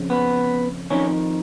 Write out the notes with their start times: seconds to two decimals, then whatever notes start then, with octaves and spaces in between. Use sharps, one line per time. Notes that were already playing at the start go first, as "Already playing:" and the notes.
Already playing: F2 C#3
0.10 B3
0.90 F2 D#3 C#4